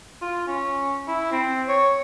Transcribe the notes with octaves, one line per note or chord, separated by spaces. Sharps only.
F4
C#4
E4
C4
C#5